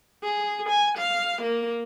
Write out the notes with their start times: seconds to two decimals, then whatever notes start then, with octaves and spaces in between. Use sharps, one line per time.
0.24 G#4
0.69 G#5
0.98 F5
1.42 A#3